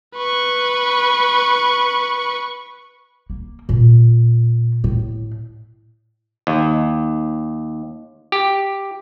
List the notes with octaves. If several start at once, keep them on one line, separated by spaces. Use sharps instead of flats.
B4 C#6
A#3
A#2
A2
D#2
G4